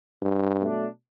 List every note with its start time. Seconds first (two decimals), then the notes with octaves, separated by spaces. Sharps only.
0.22 G2
0.59 B2 F#3 A3 D4